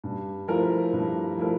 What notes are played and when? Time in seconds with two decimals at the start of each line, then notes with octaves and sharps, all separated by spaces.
0.04 G2
0.48 F3 A3 E4 A#4
0.93 G2
1.37 F3 A3 E4 A#4